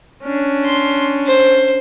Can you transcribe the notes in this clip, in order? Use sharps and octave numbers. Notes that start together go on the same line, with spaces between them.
C#4 D4
C6
C5